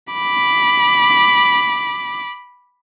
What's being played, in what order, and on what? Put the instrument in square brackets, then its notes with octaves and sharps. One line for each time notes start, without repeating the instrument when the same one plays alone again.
[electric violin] B5 D6